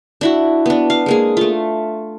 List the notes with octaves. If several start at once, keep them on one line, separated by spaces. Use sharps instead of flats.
D4 E4 F#4
B3 D4
F5
G#3 A#3 G#4
A3 F4